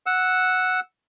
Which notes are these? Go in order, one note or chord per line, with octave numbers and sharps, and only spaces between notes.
F#5 E6